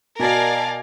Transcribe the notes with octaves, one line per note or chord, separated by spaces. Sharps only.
B2 A#4 D5 D#5 F5 G#5 A5